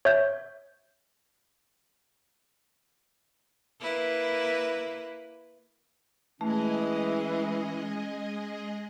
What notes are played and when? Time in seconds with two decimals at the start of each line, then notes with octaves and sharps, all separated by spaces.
0.05 C#5 E5 G6
3.81 A#3 E4 B4
6.41 E3 G#3 A3 C#4 G#4 D#5